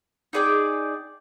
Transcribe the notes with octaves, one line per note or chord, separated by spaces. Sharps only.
D#4 G#4 D5 G5